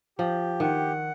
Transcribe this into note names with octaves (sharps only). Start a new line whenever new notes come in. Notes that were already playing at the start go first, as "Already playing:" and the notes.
F3 G4
D#3 F#5